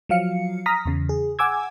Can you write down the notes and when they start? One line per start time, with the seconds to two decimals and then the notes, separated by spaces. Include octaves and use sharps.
0.09 F3 F#3 F5 C#7
0.66 A#5 D#6 F6 A#6 B6
0.85 E2 C#3
1.09 G#4
1.39 F#5 G#5 D6 E6 G#6